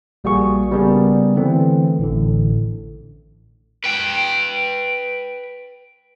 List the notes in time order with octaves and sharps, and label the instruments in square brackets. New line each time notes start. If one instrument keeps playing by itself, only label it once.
[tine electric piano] A#1 G3 A#3 F#4 G#4 C#6
C#3 G3 B3 D4 G#4 A#4
D3 E3 A3 C4
A1 A2 D3
[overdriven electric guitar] B4 G5